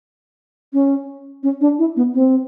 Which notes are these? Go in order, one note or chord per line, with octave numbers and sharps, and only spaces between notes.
C#4
C#4
D4
E4
B3
C4